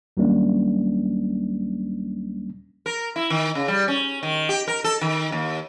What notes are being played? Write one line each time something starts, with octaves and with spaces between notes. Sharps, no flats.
D#2 F#3 G3 A#3 C#4 D4
A#4
E4
D#3
C#3
G3
C#4
D#3
G4
A#4
A4
D#3
D#2